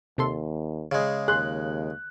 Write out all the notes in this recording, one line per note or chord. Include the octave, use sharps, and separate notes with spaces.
D#2 C3 A4 C6
C#3 G#3
D#2 G#4 C6 F#6